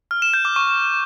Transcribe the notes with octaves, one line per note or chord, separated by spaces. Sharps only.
F6
E7
G6
D6
C#6